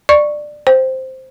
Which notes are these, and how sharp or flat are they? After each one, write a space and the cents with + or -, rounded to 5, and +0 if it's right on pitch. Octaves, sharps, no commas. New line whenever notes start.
D5 +15 C#6 +0
C5 +0 G5 +0